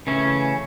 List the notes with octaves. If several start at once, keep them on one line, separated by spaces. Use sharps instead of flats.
C#3 E3 A3 C#4